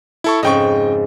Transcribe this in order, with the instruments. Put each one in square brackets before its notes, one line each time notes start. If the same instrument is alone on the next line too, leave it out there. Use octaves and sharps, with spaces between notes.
[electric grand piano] E4 A4 C#6
[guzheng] F2 G#2 C#3 [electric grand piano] D#5 G5 C#6